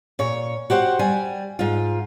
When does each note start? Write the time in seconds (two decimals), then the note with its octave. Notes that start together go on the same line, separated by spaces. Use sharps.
0.19 A#2 C#5
0.70 F#4 G4 C5 F5 F#5
0.99 G3 G#5
1.59 G#2 F4